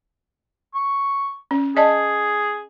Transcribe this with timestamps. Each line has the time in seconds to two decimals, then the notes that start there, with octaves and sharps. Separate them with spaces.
0.75 C#6
1.51 C#4
1.77 G#4 D5 D#5 A5